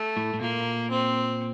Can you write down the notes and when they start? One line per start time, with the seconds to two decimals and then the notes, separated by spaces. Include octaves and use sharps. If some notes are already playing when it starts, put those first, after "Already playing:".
Already playing: A3
0.17 A2
0.34 A2
0.41 A#2 A#3
0.91 C4